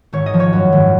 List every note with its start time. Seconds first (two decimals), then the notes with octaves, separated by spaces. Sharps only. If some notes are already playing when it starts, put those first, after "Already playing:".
0.13 G#1 C#5
0.26 D#5
0.34 F3
0.40 C#5
0.53 F#2
0.73 G#1